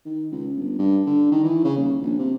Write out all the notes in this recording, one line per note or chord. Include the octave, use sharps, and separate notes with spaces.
D#3
C#2
G1
G2
D3
D#3
E3
C#3
D#1
A#1
C3